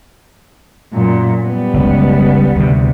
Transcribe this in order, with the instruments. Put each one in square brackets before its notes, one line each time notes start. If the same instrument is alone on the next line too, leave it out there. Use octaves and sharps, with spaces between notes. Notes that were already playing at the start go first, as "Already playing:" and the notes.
[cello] F#2 A#2
G3 B3
[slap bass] F#1 C#2
D2 C3